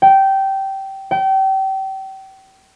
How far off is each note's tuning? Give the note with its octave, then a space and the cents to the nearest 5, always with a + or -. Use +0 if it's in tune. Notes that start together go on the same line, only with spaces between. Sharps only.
G5 -15
G5 -30